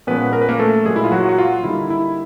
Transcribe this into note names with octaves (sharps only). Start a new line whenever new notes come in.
A#2 F3 G#3 B3 C#4 B4
A#4
B4
A#3 A#4
A3 A4
A#2 F#3 G#3 A#3 G#4
E4
F4
F#3 F#4
F#4
F4
D3 G3 A#3 D#4 E4
E4